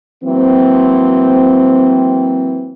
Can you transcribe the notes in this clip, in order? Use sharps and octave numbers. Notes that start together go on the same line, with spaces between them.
E3 F#3 A#3 C4